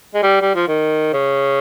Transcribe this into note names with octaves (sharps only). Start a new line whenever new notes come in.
G#3
G3
G3
F3
D#3
C#3